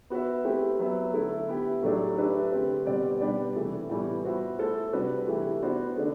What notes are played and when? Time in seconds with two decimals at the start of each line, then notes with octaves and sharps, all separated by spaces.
0.10 B3 F#4 B4 E5
0.45 A3 C4 E4 G4 B4
0.79 F#3 B3 E4 B4 E5
1.14 D3 A3 E4 A4
1.48 B3 E4 G4
1.83 A2 F#3 A3 D4 G4
2.18 A3 D4 G4 B4 E5
2.51 D3 A3 C4 G4 B4
2.86 B2 G3 C4 G4 D5
3.21 G3 B3 D4 G4 D5
3.55 C3 E3 A3
3.90 A2 E3 G3 B3
4.24 B3 F#4 C5 E5
4.59 A3 E4 A4 C5
4.93 C3 G3 D4 F#4 B4
5.27 E3 A3 E4 G4
5.62 B3 D4 F#4 C5
5.97 D3 A3 D4